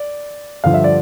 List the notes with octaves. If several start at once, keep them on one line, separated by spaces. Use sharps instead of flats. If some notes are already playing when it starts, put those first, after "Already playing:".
Already playing: D5
G2 D3 F3 F5
E5
D5